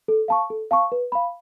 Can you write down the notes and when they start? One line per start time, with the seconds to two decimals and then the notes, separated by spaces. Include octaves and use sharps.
0.08 A4
0.28 F5 A5 C#6
0.50 A4
0.71 F5 A5 C#6
0.92 B4
1.12 F5 B5